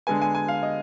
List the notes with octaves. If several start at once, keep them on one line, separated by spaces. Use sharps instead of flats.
D3 G#3 B3 G#5
G#5
G#5
F5
D#5